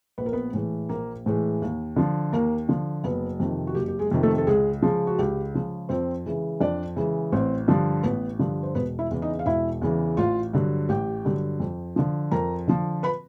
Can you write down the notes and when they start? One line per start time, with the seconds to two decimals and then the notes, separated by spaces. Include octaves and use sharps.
0.18 A#1 B4
0.26 A#4
0.33 B3 B4
0.53 A2 E3 G#3
0.89 A#1 A#3 A#4
1.26 A2 E3 G#3
1.62 D#2
1.96 D3 F3
2.32 D#2 A#3 A#4
2.69 D3 F3
3.04 F#1 B3 B4
3.40 F2 C3 D#3
3.67 F#4
3.75 F#1 G4
3.88 G4
3.99 G#3 G#4
4.11 F2 C3 D#3
4.23 A3 A4
4.38 A4
4.47 C#2 G#3 G#4
4.82 C#3 F3 G#3
5.07 F#4
5.19 C#2 G4
5.54 C#3 F3 G#3
5.89 F2 C4 C5
6.26 C#3 E3 G#3
6.60 F2 D4 D5
6.96 C#3 E3 G#3
7.32 A1 C4 C5
7.68 G2 D3 F3
8.03 A1 B3 B4
8.39 G2 D3 F3
8.63 C5
8.75 E1 B3 B4
8.99 E4 E5
9.10 E2 C#3 E3
9.22 D#4 D#5
9.39 F5
9.46 E1 E4 E5
9.82 E2 C#3 E3
10.17 A1 F4 F5
10.53 G2 D3 F#3
10.89 A1 G4 G5
11.25 G2 D3 F#3
11.60 F2
11.96 D3 F3
12.31 F2 A#4 A#5
12.68 D3 F3
13.03 B4 B5